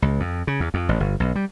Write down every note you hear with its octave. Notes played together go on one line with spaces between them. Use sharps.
C#2
F2
C#3
E2
F2
A1
G1
B1
G3